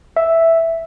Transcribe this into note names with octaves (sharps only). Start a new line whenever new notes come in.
E5